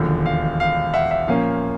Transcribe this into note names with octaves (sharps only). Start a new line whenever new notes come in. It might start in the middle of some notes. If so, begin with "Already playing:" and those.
Already playing: E1 D#2 D3 F3
F5
F5
E5 F#5
E5
A#2 F3 A#3 C#4 F5